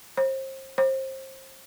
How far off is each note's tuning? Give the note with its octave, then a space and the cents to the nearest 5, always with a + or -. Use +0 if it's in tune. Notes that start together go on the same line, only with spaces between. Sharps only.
C5 +30
C5 +25